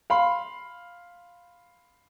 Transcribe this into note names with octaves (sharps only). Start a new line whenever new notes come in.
F5 B5 C6